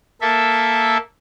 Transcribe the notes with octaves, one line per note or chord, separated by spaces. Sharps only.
A#3 A4 E5